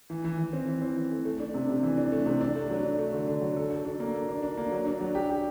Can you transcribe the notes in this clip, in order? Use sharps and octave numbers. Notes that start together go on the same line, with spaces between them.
E3
E3
E3
C4
E3
C4
E3
A3
A3
D4
C3
C3
E3
D4
A3
C3
D4
A3
F#3
D4
A3
D3
D4
F#3
A4
A4
D4
A#3
A4
D4
D4
A#3
F#3
D4
F#3
G4
G4